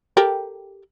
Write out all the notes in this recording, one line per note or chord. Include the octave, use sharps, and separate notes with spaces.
G4 A4 A#4